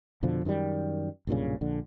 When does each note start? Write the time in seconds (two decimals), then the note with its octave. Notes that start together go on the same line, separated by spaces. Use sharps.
0.23 F2 B2 D3 F3
0.45 F#2 D#3 E3 G3
1.27 B1 G2 A#2 C#3
1.61 A#1 D3